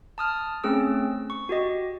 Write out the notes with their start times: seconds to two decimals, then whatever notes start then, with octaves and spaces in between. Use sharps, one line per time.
0.18 A5 D#6 F6
0.64 A3 C4 C#4 G#4 E6
1.30 C#6
1.49 F#4 G4 D#5